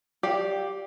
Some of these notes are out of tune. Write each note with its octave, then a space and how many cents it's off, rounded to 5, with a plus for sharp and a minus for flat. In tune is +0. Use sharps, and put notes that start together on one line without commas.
G4 +0 D5 +0 F5 +25